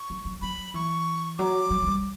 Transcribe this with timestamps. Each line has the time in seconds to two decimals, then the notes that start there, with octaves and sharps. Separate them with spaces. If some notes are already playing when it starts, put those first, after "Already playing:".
Already playing: C#6
0.10 F#3
0.25 F#3
0.42 F#3 B5
0.74 E3 C#6
1.38 F#3 D6
1.70 F#3
1.82 F#3
1.87 G3